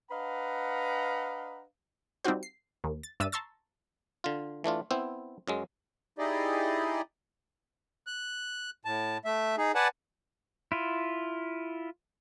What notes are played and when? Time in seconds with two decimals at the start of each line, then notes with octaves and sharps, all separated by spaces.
0.11 D4 B4 D#5 F5 F#5 A#5
2.24 G3 C4 D#4 F4 F#4 C5
2.43 C7
2.84 D#2
3.03 A6
3.20 G2 D4 E5 E6 A6 D#7
3.32 A5 A#5 C6 C#6 E6 A6
4.24 D3 F4
4.64 E3 A3 D4 F4
4.91 B3 C4 E4 C5
5.48 F#2 F#3 G#3
6.19 D#4 E4 G4 G#4 D5 D#5
8.07 F#6
8.85 A2 A5
9.25 A3 E5
9.58 D#4 G#4
9.75 B4 D5 F#5 G#5 A5
10.72 E4 F4